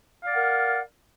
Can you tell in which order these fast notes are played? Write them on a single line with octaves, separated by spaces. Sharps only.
F5 D5 F#5 A#4